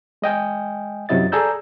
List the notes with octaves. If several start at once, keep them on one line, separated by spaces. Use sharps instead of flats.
G#3 D#5 G5 G#5
F#2 C3 F#3 E4 D#5 A6
G#4 A4 D5 A#5 E6 G6